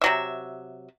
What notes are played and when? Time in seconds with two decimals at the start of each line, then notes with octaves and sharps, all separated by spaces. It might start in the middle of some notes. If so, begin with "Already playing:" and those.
0.02 C3 F#3 E5